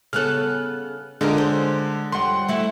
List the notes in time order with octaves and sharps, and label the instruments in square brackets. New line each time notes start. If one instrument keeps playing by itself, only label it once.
[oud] C#3 B3 A4 [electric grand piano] F6 F#6
[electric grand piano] D3 G#3 [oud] D#4 F4 A#4
[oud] C5
[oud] F2 G3 [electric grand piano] F#5 C6
[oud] A3 E4 F#4